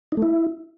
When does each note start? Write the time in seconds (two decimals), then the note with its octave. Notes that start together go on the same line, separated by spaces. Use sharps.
0.12 D#4
0.17 A3
0.22 E4